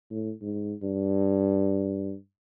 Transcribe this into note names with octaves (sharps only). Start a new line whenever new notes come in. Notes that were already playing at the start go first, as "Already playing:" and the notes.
A2
G#2
G2